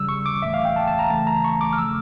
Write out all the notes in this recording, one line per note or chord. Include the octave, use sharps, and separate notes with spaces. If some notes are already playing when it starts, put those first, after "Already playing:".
Already playing: C#3 G3 E6
C#6
D6
A2 E3 A3 E5
F5
G5
A5
A5
A#5
C#3 E3 A3 A5
A#5
C#6
D6
F6
C#3 F3 A3 E6